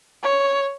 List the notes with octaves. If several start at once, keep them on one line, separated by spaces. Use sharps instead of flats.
C#5